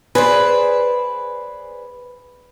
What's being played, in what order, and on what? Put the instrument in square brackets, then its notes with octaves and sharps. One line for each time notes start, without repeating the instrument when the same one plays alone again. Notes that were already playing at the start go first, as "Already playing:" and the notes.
[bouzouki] G#4 C5 D5 [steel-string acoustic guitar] B4